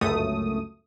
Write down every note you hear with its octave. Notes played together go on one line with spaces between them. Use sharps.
G1 C#2 F#2 A3 D#6